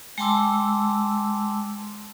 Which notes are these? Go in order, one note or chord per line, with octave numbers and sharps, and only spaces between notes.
G#3 G5 A5 C6 D6 E6